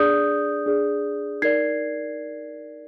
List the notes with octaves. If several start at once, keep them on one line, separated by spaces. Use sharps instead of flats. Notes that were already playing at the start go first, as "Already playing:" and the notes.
Already playing: D4 G#4 D5 D#6 G6
D4 G#4 D5
D#4 A#4 D5 G#6 C7